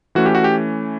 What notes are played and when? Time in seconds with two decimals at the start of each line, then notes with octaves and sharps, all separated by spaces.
0.15 E3 A3 C#4 F#4
0.26 G4
0.35 F#4
0.44 G4